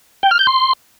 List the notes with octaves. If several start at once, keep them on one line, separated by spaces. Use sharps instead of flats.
G5
F6
G6
C6